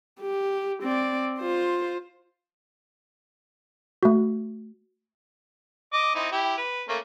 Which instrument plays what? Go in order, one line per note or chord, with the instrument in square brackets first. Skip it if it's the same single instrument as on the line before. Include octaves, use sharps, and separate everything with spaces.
[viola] G4
C4 D5
F4 C5
[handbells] A3 F#4
[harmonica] D#5 D6
C4 D#4 E4
E4 G4
B4
A3 A#3 C#4